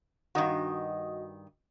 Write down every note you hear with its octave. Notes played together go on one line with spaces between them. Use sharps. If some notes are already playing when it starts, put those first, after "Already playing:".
G2 D#3 F#4 D#5